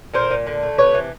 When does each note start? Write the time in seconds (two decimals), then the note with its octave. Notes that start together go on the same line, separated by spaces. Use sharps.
0.14 A#2 A#4 C5
0.30 A#2
0.47 D3
0.63 A3
0.78 C3 B4 C#5
0.94 E3